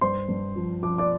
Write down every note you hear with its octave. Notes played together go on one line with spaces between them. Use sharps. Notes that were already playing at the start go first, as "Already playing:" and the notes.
G2 C5 C6
G2
F3
F3 D6
D5 D6